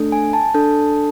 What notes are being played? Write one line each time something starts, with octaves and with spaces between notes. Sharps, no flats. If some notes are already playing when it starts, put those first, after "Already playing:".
Already playing: A3 D4 A4
G#5
A5
D4 A4